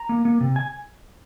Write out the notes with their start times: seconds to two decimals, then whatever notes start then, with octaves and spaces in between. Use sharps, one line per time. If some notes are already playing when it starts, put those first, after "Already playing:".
Already playing: A#5
0.09 A#3
0.25 A#3
0.41 C3
0.56 G#5